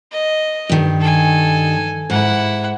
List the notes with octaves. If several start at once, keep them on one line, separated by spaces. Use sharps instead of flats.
D#5
G2 D#3
A4 G#5
G#2 E4 F#5